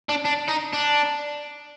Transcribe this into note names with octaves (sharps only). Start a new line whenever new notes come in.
D4
D4
D#4
D4